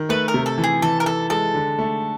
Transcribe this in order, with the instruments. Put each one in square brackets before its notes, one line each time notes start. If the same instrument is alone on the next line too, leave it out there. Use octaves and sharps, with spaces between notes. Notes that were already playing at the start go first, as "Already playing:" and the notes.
Already playing: [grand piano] D#3
[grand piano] A3 [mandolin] B4
[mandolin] A#4
[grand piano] C3
[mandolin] A4
[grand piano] E3
[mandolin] G#4
[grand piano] E3 [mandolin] A4
[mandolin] A#4
[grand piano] E3 [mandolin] A4
[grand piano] G#3 [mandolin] A4
[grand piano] D3
A3